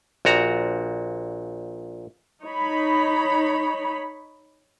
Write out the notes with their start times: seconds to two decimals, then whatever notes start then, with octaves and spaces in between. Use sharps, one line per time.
0.25 A#1 A#2 F#4 A#5
2.43 D#4 C#5 B5